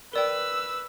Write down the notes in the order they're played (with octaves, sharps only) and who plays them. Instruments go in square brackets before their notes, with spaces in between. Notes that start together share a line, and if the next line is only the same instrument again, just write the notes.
[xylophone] A#4 D5 G5 [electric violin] B4 E6